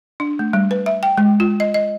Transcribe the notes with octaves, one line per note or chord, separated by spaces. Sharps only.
D4
A3
G3
B4
E5
G5
G#3
F4
D#5
D#5